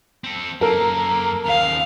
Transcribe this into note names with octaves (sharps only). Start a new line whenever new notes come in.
C4 A4
F#2 A#3 A4 A#4 A#5
D#2 C#3 F5